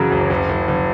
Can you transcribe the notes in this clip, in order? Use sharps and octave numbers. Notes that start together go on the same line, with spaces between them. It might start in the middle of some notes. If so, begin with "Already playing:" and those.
Already playing: F#2 C#3 E3 F#3
F#1
F#1
F#1
F#1